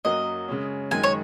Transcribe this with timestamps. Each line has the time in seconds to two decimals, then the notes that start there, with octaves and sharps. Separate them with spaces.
0.05 F#2 F#3 A#3 F#4 A#4 D#5
0.48 C#3 G#3 C#4
0.91 F#2 D#3 G#3 G#5
1.04 C#5